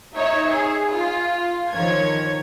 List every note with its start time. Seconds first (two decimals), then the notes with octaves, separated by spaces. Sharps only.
0.17 D#4 C#5 E5
0.52 G#4
0.92 F4
1.72 D#3 F3 C#5 G#6